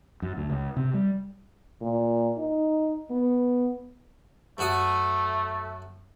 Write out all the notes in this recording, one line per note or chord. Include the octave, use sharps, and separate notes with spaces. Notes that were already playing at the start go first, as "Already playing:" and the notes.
F#2
D2
C#2
C3
G3
A#2
D#4
B3
F#2 A3 F#4 D#6